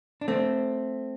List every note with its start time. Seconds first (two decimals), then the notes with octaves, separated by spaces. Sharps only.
0.21 D4
0.28 A3 C4